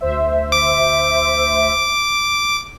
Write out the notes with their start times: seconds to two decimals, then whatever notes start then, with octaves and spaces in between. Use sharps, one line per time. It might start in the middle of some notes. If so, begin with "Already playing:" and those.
0.01 D2 C5 E5
0.52 D6